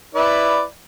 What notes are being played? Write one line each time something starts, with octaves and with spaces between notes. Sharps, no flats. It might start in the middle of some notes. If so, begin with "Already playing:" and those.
E4 B4 D5